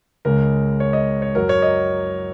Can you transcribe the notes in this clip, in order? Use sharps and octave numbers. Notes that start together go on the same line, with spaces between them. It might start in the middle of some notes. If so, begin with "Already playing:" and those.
C#2 C#3 G#3 A#4
C#5
D#5
C#5
F#2 F#3 A#4
C#5
D#5